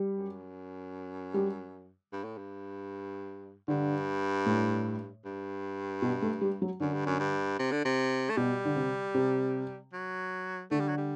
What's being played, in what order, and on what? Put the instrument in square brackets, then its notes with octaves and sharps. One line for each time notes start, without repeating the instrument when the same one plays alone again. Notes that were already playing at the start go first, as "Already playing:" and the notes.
Already playing: [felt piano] G3
[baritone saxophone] F#2
[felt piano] G3
[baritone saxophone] G2
A2
G2
[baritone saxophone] G2 [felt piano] D3
[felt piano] A2
[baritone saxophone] G2
[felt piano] B2
A3
G3
F#3
[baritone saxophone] F#2 [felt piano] D3
[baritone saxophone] G2
F#2
G2
C3
D3
C3
A3
[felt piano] B2 [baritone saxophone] G3
[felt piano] D3
C3
C3
[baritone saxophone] F#3
[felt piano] D3 [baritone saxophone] A3
[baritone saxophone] G3
F#3
G3